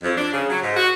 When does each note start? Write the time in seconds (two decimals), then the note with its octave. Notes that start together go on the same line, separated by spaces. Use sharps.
0.02 F2
0.16 D4
0.32 C#3
0.48 F#3
0.60 G#2
0.76 F#4